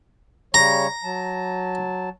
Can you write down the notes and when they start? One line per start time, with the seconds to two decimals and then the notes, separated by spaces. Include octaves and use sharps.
0.54 C#3 G3 C#5 A#5
1.04 F#3 A5